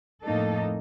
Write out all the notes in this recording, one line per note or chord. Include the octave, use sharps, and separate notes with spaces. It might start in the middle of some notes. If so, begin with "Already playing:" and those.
F2 A2 A#3 D#4 A4